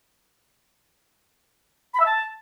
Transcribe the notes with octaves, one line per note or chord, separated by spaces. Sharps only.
B5
E5
A5